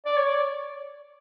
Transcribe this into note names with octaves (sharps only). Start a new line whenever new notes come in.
D5
C#5
D5